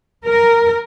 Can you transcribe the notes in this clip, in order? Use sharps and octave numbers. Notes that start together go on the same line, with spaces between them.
A#4